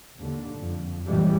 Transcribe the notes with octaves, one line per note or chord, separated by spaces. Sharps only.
D#2 D3
F2
A1 F2 A2 E3 G3 G#3